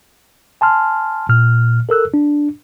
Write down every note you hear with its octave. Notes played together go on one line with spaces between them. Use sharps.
G#5 A5 C6 F6
A#2 F6
A4 A#4 E6 F#6
D4